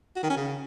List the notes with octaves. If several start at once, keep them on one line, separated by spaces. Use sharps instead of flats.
F#4
D#3
C#4
C#3